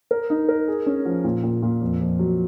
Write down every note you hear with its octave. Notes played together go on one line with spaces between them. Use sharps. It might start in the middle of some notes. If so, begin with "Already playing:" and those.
A#4
D#4
A#4
G#4
C#4
F3
A#2
A#2
A#2
F2
F2
F#3